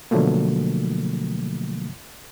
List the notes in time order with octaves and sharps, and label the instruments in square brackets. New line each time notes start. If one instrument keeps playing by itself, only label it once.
[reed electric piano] B2 D3 F3 F#3 A3 A#3